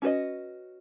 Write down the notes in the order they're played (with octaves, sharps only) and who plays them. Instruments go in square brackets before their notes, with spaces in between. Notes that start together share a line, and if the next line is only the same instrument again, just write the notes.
[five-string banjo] C#4 F#4 B4 D#5